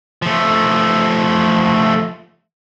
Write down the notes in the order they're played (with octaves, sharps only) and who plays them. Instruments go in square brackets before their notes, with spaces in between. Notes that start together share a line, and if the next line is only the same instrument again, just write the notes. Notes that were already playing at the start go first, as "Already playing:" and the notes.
[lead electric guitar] F3 A3